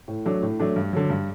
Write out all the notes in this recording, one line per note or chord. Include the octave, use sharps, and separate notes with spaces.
A2
F#3 A3 D4
A2
F#3 A3 D4
G2
D3 F#3
G2